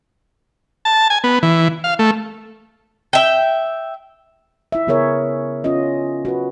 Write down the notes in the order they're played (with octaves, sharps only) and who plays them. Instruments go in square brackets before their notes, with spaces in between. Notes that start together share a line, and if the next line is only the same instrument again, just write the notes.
[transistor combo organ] A5
G#5
B3
E3
F5
A3
[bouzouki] E5 G5
[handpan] E4 E5
C#3 B3 G#4 A#4 C#5 E5
C#4 F4 D#5
F#4 B4